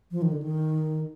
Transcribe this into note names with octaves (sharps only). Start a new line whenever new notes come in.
F3
D#3
D3
D#3